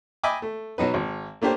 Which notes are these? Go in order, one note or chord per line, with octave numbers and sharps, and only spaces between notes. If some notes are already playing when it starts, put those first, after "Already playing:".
D#5 E5 G5 G#5 B5 D6
A3
B2 F#3 D#4 B4
G#1
A3 A#3 D4 G4 C5